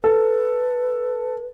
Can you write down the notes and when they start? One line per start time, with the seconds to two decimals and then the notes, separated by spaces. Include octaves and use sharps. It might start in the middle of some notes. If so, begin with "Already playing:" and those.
0.04 A4 B4